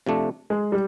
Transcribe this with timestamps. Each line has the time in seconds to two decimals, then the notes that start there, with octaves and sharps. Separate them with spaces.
0.06 C3 F3 A3 D4
0.50 G#3
0.72 G3